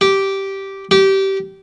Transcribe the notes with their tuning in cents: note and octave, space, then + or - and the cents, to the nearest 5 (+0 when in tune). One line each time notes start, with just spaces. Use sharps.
G4 -10
G4 -20